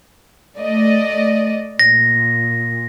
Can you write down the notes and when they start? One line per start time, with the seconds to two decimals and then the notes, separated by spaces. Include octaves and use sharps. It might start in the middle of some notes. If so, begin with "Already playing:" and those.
0.57 A3 D5 D#5
1.79 A#2 A#6